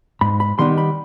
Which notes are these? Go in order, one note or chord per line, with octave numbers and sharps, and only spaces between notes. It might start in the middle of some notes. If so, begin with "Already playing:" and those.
G#2 B5
B5
D#3 G3 B3 D#4 C6
B5